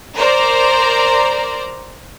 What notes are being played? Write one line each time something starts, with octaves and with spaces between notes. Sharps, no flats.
A#4 C5 D5 A#5